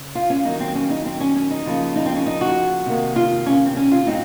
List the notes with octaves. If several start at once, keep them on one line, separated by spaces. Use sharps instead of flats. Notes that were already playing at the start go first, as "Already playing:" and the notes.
Already playing: C#3
F4
C#4
D#3 F#3 A#3 D#4
C4
C#4
D#4
C4
C#4
C#4
D#4
C#3 F3 A#3
D#4
C4
C#4
D#4
F#4
C3 D#3 A#3
F4
C#4
C4
C#4
F4
A2 F#3 C4 D#4